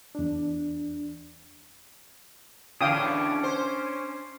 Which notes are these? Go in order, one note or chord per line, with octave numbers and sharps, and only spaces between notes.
E2 D4
E2 A2 D3 C#4 D4 F5 G5 D#6
C5